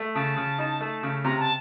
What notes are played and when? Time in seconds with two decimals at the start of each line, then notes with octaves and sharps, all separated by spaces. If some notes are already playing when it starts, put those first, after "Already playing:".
Already playing: A3
0.15 C#3 A5
0.37 C#3
0.58 D#4
0.81 A3
1.03 C#3
1.25 C3 A#5
1.40 A5